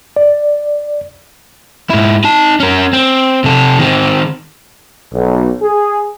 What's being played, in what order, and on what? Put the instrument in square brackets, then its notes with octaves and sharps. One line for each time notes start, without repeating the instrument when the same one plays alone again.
[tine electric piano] D5
[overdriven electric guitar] G#2 E4
D#4 A5
C#4 A#4
C4
C3 A4
D#3 C4
[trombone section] B1
G#4